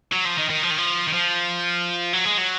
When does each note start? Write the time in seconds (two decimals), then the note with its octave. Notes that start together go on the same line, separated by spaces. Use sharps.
0.12 F#3
0.25 F3
0.38 D#3
0.50 D#3
0.63 F3
0.71 D#3
0.78 F3
1.07 D#3
1.13 F3
2.13 F#3
2.25 G#3
2.38 F#3